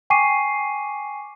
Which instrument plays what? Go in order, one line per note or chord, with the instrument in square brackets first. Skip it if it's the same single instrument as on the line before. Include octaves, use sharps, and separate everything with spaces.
[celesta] G5 G#5 C#6 D6 C7 D#7